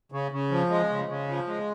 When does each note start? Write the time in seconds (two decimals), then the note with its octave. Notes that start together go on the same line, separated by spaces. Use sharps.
0.12 C#3
0.32 C#3
0.51 F3
0.70 G#3
0.89 C#3
1.09 C#3
1.28 F3
1.47 G#3